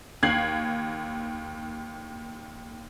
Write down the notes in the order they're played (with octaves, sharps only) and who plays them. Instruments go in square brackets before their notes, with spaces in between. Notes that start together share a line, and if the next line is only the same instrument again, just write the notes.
[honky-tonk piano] D#2 G#6 C7 F#7